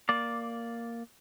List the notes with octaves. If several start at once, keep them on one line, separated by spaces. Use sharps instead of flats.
A#3 D5